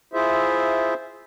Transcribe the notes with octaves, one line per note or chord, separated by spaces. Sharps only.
E4 F4 G#4 C5 E5